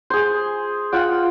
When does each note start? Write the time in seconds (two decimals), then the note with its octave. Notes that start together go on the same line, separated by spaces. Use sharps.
0.10 G#4 C5
0.92 F4 F#5 G5